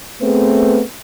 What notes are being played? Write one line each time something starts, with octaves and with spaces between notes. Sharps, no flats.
A3 B3 C4 G#4 B4